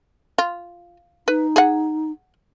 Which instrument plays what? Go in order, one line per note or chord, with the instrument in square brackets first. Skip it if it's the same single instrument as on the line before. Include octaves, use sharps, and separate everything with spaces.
[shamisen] F4
[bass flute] D#4 [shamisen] B4
[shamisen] G#4 F#5